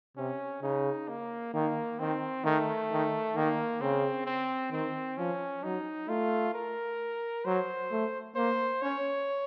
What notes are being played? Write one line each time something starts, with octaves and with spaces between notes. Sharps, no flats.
C3 C#4
C#3 D#4
A#3
D#3 A#3
D#3 C4
D#3 A3
D#3
D#3 A#3
C#3 C4
C4
D#3 C4
F3 C#4
F#3 D#4
A3 F4
A#4
F#3 C5
A3
A#3 C5
C#4 C#5